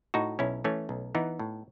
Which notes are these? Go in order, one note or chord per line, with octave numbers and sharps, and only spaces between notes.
A2 D#4 F#4
B1 C#4 E4
E3 A3 C#4
B1
E3 B3 D#4
A2